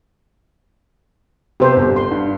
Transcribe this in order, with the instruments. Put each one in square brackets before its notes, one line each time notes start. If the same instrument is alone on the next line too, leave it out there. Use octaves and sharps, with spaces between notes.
[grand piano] C3 B3 [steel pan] G4 C5
[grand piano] G1
[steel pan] C6
[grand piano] G2